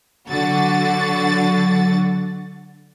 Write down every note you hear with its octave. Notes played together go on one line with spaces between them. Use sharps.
D3 F#3 F#4 A6